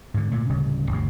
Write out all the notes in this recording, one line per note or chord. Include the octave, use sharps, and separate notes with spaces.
G#2 D3
A#2 A3
D1 C#3 G3 C#4
G1 D2 C3